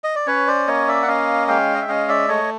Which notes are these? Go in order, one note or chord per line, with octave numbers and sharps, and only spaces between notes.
D#5
D5
C#4 B4 C#5
C5 D5
A#3 C#5 D#5
D5 E5
F#5
C#4 D#5 F5
G#3 F5 G5
D#5
E5
C#4 D#5 F5
D5 E5
A3 C#5 D#5